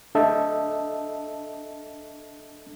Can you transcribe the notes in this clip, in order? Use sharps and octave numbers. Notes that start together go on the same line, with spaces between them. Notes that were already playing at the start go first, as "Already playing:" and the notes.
D4 A4 D#5 E5 A5